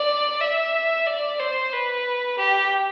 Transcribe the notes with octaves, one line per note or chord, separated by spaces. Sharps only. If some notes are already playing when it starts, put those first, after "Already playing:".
Already playing: D5
E5
D5
C5
B4
G4